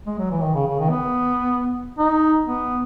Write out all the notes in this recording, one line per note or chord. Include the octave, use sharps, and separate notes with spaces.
G#3
F#3
E3
D#3
C#3
C#3
D#3
B3
D#4
B3